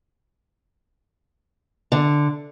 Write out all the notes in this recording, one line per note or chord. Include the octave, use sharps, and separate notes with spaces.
D3